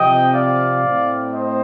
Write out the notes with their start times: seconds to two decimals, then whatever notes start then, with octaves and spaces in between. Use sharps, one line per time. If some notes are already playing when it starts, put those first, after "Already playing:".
Already playing: C3 F3 C4 D#5 G5
0.33 D5 F5
0.83 A2 A3 C4
1.33 C5 D#5